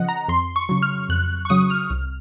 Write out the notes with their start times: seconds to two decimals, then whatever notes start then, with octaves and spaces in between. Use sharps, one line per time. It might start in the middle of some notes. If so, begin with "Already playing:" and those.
Already playing: C#3 F3 D#5 F#5
0.09 A#5
0.28 F2 C6
0.56 C#6
0.69 C#3 F#3
0.82 F6
1.09 F2 F#6
1.45 C#6
1.50 C#3 F#3 D#6
1.70 F6
1.90 C2